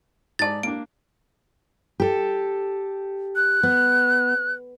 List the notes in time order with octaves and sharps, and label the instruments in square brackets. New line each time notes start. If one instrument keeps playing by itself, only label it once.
[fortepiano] G#2 D5 [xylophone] A5 A6
[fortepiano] A#3 D4 [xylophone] D7
[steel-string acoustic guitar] G4 A4
[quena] F#6
[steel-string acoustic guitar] B3